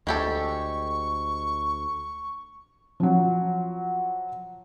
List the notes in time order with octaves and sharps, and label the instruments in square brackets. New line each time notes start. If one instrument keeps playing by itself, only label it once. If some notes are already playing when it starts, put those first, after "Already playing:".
[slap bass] D2 [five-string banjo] G#3 G4 A4 [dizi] C#6
[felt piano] F3 F#3